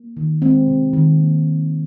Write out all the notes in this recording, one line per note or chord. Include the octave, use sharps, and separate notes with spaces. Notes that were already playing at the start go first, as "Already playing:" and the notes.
Already playing: A#3
D#3
G#3 C4
C3
D#3
A#3